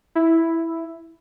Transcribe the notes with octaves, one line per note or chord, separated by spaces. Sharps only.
E4